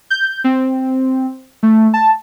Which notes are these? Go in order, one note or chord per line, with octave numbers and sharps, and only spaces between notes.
G6
C4
A3
A5